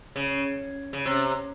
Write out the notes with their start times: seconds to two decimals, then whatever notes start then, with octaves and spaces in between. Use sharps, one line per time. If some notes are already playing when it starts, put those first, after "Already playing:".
0.16 C#3
0.93 C#3
1.06 C3